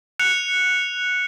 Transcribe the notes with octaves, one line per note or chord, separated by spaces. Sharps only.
F#6 C#7 F7